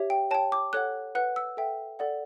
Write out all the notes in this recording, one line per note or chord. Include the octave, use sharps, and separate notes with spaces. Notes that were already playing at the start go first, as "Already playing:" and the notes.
Already playing: G4 C#5 E5
G5
C#5 G5 A5
D6
A4 C#5 F#5 F#6
B4 F#5 F#6
E6
A4 E5 G5
A4 D5 F#5